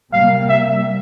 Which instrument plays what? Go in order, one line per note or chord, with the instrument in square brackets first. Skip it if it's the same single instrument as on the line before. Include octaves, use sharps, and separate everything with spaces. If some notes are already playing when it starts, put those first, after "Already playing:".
[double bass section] C3 G3 A#3 [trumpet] F5
[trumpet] E5